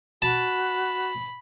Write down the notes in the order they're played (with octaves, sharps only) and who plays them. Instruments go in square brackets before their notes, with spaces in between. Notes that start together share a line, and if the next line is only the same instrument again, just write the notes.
[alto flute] F#4 [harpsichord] A5 [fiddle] B5